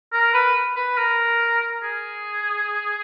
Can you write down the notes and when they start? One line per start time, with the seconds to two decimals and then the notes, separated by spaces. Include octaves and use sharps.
0.13 A#4
0.34 B4
0.76 B4
0.97 A#4
1.83 G#4